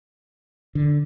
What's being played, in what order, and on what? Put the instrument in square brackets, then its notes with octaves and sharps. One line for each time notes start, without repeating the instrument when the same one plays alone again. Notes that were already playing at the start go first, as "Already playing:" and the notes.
[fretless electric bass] D3